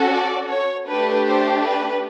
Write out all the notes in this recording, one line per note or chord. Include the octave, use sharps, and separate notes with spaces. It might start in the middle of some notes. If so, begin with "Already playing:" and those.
Already playing: C#4 F#4 A4
D5
C#5
A3 D4 G4 B4
C5
B4